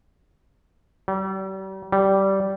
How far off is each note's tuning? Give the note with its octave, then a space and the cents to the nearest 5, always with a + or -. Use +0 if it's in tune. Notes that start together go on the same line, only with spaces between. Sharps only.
G3 -40
G3 -15